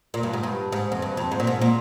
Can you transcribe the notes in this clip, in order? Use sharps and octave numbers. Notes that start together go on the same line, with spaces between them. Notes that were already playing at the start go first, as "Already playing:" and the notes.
A#2
G2
G#2
G2
G#2
F2
G2
F2
G#2
A#2
G#2
A#2